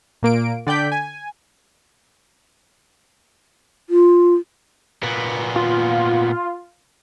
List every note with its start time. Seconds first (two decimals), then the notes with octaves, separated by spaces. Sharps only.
0.23 A#2 A#3 D7
0.67 D3 D5 G5 G6 B6
0.92 G#5
3.90 F4
5.03 A#2 B3
5.56 F4